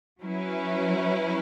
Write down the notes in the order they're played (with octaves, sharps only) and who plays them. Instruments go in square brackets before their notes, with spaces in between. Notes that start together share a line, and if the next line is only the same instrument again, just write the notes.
[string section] F#3 C#4 E4 B4